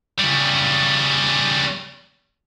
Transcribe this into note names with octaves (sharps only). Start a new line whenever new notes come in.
C#3 G3